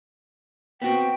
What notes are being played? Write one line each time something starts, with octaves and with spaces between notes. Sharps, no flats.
B3 C4 F#4 G5